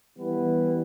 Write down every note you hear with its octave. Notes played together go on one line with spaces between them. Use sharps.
E3 G3 B3 E4 B4